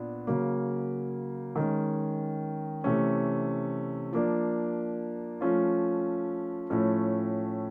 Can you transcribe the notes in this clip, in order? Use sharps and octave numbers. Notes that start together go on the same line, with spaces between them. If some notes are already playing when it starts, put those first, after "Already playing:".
Already playing: A#2 B3 D4
C#3 F#3 A#3
D#3 G#3 C#4
C3 E3 A3 C#4
F3 A#3 D4
F3 A3 C#4 F4
A2 F3 A3 C#4